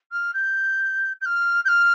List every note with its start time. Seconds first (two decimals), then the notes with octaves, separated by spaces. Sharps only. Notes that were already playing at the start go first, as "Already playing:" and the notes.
0.11 F6
0.33 G6
1.20 G6
1.25 F6
1.64 G6
1.68 F6